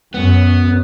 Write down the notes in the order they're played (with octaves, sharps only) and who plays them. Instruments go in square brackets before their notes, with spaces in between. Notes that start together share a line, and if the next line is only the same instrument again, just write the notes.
[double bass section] F#2 [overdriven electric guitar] B3